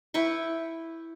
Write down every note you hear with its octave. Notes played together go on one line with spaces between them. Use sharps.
E4 B4 G5 C#6